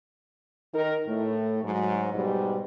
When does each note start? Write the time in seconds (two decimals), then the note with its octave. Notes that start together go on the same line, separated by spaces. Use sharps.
0.74 D#3 D#4 A#4
1.08 A2 A3
1.64 G#2 F#3
2.14 G#2 B2 G3